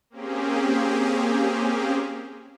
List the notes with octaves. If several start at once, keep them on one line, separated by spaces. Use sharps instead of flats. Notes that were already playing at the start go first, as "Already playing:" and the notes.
A#3 C4 C#4 G4 G#4